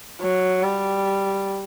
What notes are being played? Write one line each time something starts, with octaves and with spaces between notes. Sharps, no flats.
F#3
G3